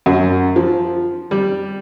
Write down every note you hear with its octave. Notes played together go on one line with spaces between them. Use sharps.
F#2
F3
G3